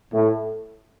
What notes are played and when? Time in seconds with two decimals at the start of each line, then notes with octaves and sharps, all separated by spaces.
0.13 A2